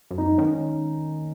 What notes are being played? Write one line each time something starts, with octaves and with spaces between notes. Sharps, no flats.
F#2
D#4
D#3 C#4